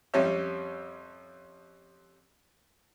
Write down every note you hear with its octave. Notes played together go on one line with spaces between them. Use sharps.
F2 G3 C#4 C#5 E5